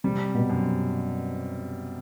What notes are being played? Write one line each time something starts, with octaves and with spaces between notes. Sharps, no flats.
C3 G3
B2
F#2